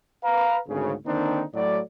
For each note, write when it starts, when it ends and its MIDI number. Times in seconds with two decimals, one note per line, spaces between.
0.24 0.58 71
0.24 0.58 77
0.24 0.58 82
0.68 0.93 32
0.68 0.93 38
0.68 0.93 49
1.06 1.43 50
1.06 1.43 51
1.06 1.43 58
1.06 1.43 60
1.06 1.43 62
1.06 1.43 63
1.54 1.79 45
1.54 1.79 54
1.54 1.79 74